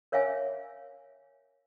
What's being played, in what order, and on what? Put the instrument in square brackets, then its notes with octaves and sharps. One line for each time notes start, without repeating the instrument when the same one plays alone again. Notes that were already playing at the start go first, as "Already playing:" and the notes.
[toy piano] A#4 C#5 E5 F5 G#5